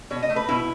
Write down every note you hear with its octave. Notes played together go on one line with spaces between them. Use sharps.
B2 C#5
D#5
A3
B4
B2 E4